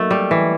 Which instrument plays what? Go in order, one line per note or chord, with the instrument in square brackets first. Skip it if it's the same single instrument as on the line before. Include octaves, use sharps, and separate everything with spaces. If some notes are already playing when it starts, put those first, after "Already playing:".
Already playing: [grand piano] F#3 A#3 D#4 [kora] A3
[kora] G3
E3